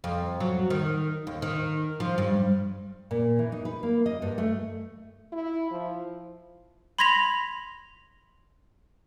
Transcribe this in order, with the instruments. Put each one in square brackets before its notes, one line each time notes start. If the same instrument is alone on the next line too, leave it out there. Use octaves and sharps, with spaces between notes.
[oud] F2
F#3
D#3
D#2
D#3
F3
G2
[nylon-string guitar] A#2
E3
D#4
B4
A#3
D#5
G2
A3
[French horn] E4
F3
[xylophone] B5 C6 G#6 A#6 B6 F7